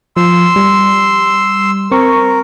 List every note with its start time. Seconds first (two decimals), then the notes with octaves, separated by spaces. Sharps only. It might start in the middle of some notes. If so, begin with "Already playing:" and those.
0.17 F3 C6 E6
0.56 G3
1.91 C4 A#4 C#6